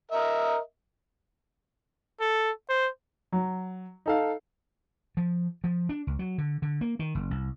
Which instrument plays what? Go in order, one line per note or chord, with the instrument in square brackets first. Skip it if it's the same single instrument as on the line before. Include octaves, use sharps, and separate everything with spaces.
[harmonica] A#4 D#5 E5
[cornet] A4
C5
[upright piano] F#3
D#4 A4 F5
[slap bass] F3
F3
D4
C#2
F#3
D3
D3
A#3
D#3
F#1
C2